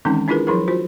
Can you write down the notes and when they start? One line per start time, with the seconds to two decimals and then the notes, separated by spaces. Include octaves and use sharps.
0.05 D#3 E3 G#3 C4 C#4 D#4
0.28 D4 E4 F4 G#4 A#4 B4
0.47 F3 F#3 E4 G#4 A#4
0.68 F4 F#4 C5